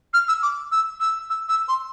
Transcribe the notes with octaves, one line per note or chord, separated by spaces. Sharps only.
F6
E6
D6
E6
E6
E6
E6
C6